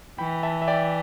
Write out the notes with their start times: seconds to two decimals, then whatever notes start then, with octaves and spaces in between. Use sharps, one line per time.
0.18 E3 G5 B5
0.43 E5 A5
0.62 E5
0.68 D5 G5